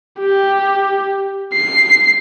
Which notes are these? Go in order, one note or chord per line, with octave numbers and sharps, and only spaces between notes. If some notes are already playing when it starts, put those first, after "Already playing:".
G4
C7